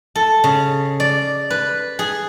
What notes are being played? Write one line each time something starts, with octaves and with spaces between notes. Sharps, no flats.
A4
C#3
D5
B4
G#4